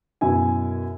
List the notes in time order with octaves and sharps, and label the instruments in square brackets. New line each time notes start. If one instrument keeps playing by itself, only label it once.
[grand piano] F#2 B2 E4 G#5